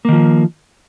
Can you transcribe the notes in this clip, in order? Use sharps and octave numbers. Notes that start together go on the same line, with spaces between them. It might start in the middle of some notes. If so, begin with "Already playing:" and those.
D#3 F3 A#3